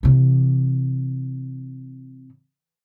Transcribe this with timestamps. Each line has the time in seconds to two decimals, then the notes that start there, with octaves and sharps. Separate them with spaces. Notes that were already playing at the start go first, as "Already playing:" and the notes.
0.03 C3 E3